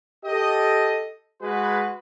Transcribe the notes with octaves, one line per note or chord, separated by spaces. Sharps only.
G4 A4 D#5
G#3 F#4 B4